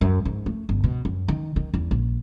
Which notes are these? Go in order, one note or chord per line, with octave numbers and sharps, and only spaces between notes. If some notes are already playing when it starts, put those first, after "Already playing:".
F#2
G#2
A3
G1
B2
F#2
D#3
D#3
E2
A#1